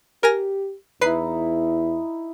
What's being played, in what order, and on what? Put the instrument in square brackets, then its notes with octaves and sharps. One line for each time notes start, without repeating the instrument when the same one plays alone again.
[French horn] G4 [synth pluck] A#4 G#5 A#6
[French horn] E2 [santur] D#4 E4 [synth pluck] B4 C7